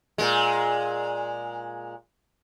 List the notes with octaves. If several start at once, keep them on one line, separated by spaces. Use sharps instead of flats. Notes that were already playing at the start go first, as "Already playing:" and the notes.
A#2 G#3